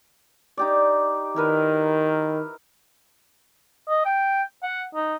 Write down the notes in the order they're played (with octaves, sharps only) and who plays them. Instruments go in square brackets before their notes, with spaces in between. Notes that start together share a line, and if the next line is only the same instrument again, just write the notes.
[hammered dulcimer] D#4 G4 D5
[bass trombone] D#3 [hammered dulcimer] E4 A#4 B4
[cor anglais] D#5
G5
F#5
D#4